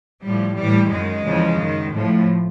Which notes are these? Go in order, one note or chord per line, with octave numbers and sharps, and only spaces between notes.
A2 F3 G3
A2 E3 G3
F#2 D#3 G#3
E2 C#3 F3
F#2 D#3
A2 F3